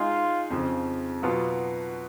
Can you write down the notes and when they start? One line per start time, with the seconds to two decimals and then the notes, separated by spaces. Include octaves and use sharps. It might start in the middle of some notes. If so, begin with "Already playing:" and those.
Already playing: G#3 D#4 F4 G#4
0.50 F2 C#3 F3
1.23 B2 F#3 B3 F4